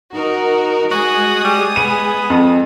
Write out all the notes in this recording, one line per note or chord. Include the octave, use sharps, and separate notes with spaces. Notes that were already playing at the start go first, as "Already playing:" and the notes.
D#4 F#4 A#4
G#3 F#4 G#4 D#6
G3
B3 D#7
F2